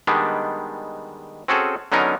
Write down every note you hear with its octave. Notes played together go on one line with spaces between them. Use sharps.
D#3 G3 G#3 B3 D4
C4 C#4 F#4 G#4 A4
D3 F#3 B3 C#4 D#4 A#4